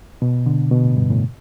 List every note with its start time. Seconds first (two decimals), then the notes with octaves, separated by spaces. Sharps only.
0.22 B2
0.46 D3
0.72 B2
0.85 A2
0.97 G2
1.10 A2